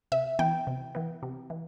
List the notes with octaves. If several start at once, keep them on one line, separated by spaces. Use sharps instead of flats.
C3 E5
E3 B3 G5
C3
E3 B3
C3
E3